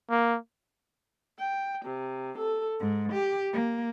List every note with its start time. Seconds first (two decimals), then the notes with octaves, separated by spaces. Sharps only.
0.10 A#3
1.38 G5
1.84 C3
2.37 A4
2.79 G#2
3.11 G4
3.52 A#3